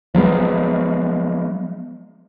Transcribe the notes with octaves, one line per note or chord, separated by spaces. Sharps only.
F3 F#3 G#3 B3